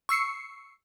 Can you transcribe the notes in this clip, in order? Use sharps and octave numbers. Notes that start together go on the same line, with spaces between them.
C#6 E6 C7 C#7